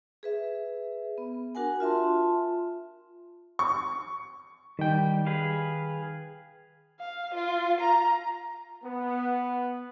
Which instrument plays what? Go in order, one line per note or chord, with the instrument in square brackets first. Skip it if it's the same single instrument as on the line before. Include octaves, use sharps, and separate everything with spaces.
[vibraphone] G#4 B4 E5
B3
D4 F#4 A#4 F#5 G#5
F4 E5 A5 C6
[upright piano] C#6
[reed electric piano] D#3 G5 [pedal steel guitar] G3
[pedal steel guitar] G#4 B4 F5
[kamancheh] F5
F4
A#5
[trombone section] B3